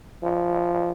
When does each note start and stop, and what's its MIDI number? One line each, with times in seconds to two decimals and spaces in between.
0.23 0.92 53